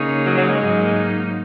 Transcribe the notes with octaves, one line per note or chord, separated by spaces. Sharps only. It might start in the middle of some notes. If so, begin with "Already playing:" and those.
Already playing: C#3 A#3 D#4 G#4 C#5
F#3
F#3
G#3
G#2 F#3 A#3 D#4